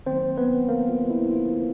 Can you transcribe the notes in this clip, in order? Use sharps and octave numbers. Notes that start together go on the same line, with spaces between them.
D#3 F#3 A#3 C4 C5
B3 B4
A#3 A#4
F4
E4
F4